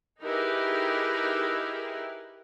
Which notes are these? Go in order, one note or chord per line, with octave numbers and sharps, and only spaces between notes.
D#4 E4 G4 G#4 A#4 B4